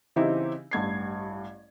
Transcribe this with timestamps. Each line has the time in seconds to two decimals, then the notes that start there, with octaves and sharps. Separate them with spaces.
0.16 C#3 E3 C4 D#4 E4 G4
0.71 A1 G2 G#6 C7